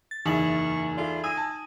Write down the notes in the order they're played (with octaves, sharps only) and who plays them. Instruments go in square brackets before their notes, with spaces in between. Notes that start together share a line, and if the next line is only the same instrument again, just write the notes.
[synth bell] A6
[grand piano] F#1 E4 [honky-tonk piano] E2 [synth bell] D#4 F#7 [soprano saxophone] C#6
[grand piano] E4 A4 D5 [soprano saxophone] F4
[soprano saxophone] G#5 [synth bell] D#6 [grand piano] E6 A#6 D#7
[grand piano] A5